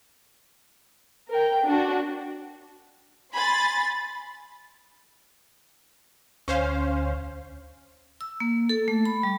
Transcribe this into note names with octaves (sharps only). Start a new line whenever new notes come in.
A#4 G5
D4 F#4
G#5 B5 C6 A6
D2 C#4 C5 F5
E6
A#3
A4
A3
B5
G3